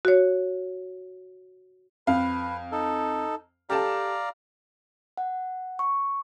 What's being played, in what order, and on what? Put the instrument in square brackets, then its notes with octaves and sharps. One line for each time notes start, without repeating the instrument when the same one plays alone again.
[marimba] F#4 C#5
[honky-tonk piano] F2 F5 [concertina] B4
[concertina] D#4 A4
[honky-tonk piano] G4 A4 A5 [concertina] D5 F5 A#5
[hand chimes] F#5
C#6